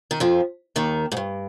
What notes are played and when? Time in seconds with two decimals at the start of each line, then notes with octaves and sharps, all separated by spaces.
0.11 D#3
0.20 F2 F3
0.76 D#2 D#3
1.12 G#2
1.17 G2